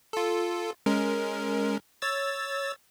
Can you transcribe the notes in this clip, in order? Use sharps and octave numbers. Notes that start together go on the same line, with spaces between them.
F4 A4
G#3 C#4 A#4
C#5 E6 A6